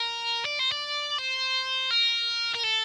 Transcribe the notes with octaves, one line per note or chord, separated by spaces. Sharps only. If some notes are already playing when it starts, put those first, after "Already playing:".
Already playing: A#4
D5
C5
D5
C5
A#4
A#4
A4